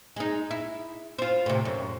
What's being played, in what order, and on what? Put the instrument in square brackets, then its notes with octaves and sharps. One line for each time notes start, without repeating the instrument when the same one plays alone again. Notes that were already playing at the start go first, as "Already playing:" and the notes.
[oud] G#3 D#4
E4
F4 C5
A2 C3
F#2